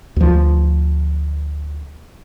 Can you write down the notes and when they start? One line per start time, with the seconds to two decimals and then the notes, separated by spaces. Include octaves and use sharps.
0.16 D2 F3